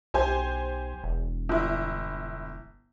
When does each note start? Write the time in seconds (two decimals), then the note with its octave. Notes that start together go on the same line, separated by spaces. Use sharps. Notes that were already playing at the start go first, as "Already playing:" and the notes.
0.14 B1 G4 C5 G#5
1.04 E1
1.49 G1 E4